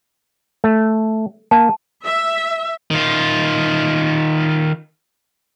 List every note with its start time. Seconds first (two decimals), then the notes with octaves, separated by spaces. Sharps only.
0.64 A3
1.51 A#3 A5
2.05 E5
2.90 D#3 F4